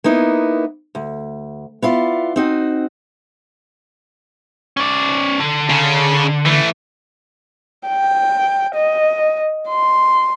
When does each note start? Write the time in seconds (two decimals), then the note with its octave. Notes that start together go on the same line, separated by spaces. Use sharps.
0.04 A#3 B3 D#4 E4
0.95 D2
1.82 B3 E4 F4 D5
2.36 C4 D#4 F#4
4.77 C#4 D5
5.40 D3
5.70 C#3
6.45 E3 A3
7.88 G5
8.75 D#5
9.69 C6